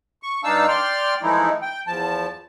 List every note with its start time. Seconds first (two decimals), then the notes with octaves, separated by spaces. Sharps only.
0.23 C#6
0.44 G2 D4 D#4 F5 A5 E6
0.68 D5 G5 C6 F6
1.23 E3 F3 G#3 A3 D#4 E4
1.62 G5
1.87 E2 F3 A5